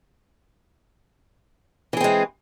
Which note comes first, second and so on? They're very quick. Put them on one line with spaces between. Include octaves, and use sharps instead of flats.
E3 G#4 C4 G#3